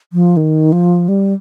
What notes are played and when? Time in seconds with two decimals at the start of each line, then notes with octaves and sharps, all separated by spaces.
0.13 F3
0.37 D#3
0.72 F3
1.08 G3